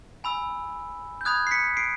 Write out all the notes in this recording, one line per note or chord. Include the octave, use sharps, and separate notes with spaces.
G#5 B5 E6
G6
B5 D#6 F#6 G#6
C7
B6 C#7
C7 D7